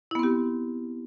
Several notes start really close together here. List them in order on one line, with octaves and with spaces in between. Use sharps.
E4 B3 C4 G4